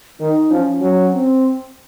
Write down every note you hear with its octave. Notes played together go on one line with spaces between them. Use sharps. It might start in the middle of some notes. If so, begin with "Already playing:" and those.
D#3 D#4
F3 C#4
F#3
C4